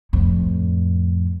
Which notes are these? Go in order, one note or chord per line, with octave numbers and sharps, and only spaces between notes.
F2 A2